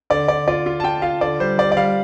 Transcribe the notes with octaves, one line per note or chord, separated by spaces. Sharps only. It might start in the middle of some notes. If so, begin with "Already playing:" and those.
D3 D5
D3 D5
F4 D5
F4
A5
F4 G5
F4 F5
D3 D5
G3 C5
G3 D5
D5
G3 F5